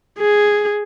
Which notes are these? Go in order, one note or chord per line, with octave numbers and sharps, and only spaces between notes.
G#4